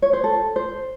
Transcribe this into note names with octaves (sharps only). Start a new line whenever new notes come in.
C#5
C5
A4
C5